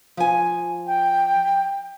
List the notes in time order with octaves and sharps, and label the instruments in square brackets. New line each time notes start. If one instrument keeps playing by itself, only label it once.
[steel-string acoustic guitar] F3 G#5
[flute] G5